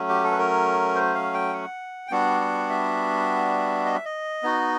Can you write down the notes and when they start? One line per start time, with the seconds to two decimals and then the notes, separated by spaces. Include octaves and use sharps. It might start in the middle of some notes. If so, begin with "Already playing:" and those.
Already playing: F#3 A3 C#4
0.09 G4
0.24 A4
0.31 B4
0.38 A#4
0.95 C5
1.14 F5
1.34 G5
1.53 F#5
2.07 G5
2.11 G3 B3 D4 F#4 F#5
2.41 F#5
2.69 E5
3.86 D#5
3.95 E5
4.05 D#5
4.43 B3 D#4 F#4